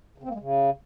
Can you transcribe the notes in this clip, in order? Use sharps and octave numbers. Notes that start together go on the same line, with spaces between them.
C#3
C4
A#3
G#3
C#3